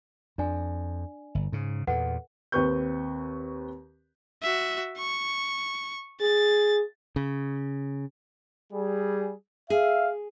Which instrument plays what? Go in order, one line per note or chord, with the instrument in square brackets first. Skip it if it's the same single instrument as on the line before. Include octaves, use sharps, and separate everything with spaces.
[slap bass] F2 [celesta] D4 D5 G#5
[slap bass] G1
G#2 C#3
[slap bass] E2 A#2 [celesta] A4 B4 F#5
[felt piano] D#2 C4 B4 C#6 G6
[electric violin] F#4 E5
C#6
[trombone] G#4 [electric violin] A6
[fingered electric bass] C#3
[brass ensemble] G3 G#4
[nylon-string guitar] G#4 [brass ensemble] E5 F5